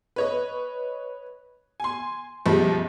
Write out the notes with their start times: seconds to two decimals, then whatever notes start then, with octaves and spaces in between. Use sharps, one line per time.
0.16 B4 C#5 D#5
1.80 G#5 C6
2.46 B1 F#2 F3 G3 G#3